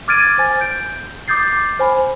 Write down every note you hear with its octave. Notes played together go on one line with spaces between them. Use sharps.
D6 F6 G#6 A6 D7 D#7
C5 G#5 A6
G6 D7
D6 D#6 G6 A6 C7
C5 G#5 B5